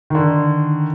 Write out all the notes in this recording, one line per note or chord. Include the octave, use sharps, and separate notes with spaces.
D3 D#3